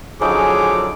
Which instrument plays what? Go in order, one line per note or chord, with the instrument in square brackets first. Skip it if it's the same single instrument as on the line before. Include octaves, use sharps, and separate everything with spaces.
[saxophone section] D3 F3 F#3 [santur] C#4 D#4 [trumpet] G#4 [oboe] D6